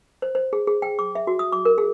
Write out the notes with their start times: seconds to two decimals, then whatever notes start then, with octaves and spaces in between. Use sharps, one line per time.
0.22 C5
0.35 C5
0.53 G#4
0.67 G#4
0.82 G5
0.99 D6
1.15 E5
1.27 F#4
1.39 D#6
1.52 D6
1.65 A#4
1.78 G#4